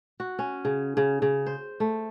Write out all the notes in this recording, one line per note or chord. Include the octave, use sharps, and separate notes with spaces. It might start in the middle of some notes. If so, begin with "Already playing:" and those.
F#4
C#4
C#3
C#3
C#3
C5
A3